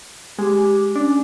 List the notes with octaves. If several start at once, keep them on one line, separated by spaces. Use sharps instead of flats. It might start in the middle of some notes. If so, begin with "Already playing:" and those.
G#3 G4
C#4 D4